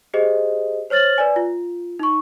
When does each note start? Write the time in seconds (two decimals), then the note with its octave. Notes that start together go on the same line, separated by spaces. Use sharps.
0.14 G4 G#4 C5 D#5
0.90 C5 C#5 F6 A6 F#7
1.18 B4 D5 G#5
1.36 F4
1.99 D#4 C#6